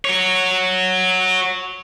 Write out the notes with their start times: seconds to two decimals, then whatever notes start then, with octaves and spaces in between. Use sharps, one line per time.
0.05 F#4 C#5